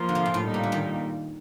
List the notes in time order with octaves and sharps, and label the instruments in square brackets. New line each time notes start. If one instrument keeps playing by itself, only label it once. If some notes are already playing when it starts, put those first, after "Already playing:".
Already playing: [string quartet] F3 A#3 F4
[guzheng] D3
C3
A#2
A2
[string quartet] A#2 G3 A#3 D#4
[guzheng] C3
D3
D#3